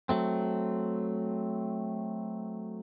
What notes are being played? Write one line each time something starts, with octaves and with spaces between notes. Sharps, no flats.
F#3 A3 C4